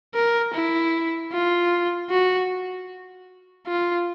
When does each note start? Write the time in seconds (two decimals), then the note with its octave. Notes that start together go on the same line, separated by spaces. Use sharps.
0.14 A#4
0.54 E4
1.32 F4
2.10 F#4
3.67 F4